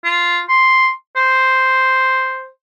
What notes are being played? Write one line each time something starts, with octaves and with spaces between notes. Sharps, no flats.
F4
C6
C5